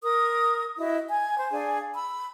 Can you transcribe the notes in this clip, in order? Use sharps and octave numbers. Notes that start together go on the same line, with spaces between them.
A#4 D#6
E4 F#4 D#5
G#5
C5
D4 G#4 F5 G#5
B5 E6